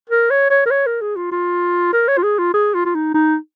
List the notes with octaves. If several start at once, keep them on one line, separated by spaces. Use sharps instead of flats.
A#4
C#5
C#5
A#4
C#5
A#4
G#4
F4
F4
A#4
C#5
F4
G#4
F4
G#4
F4
F4
D#4
D#4